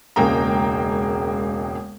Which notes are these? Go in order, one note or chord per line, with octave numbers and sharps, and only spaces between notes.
E1 C#2 G#3 A#3 G5 A#5